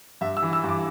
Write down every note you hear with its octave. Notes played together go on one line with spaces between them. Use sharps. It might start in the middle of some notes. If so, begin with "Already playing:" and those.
G2 E5
E6
E3
E6
G2
D6